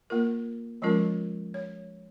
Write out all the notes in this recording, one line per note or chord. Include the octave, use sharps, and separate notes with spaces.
A#3 F4 A#4
F3 G#3 C#4 F4 A#4
C#5